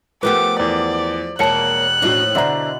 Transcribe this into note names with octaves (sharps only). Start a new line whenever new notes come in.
F3 A3 B3 G4 A#4 B4 D6
E2 D5
E1 A#3 A#4 C#5 A5 F#6 C#7
D#2 A2 F3 D4 E4 F#4
B2 D3 D4 E4 C5 D5 E5 A#5